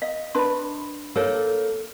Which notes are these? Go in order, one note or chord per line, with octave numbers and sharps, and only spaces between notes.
D#5 F5
D4 B4 B5 C6
A#3 A4 A#4 C#5